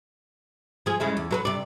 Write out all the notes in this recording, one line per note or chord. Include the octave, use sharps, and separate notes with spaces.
F3 G#4
C#3 G#3 E4
E2
F#3 A#4 B4
C3 D5